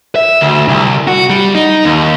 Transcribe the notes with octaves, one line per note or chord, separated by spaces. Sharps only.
E5
D2
C2
F#4
G3
D#4
D#2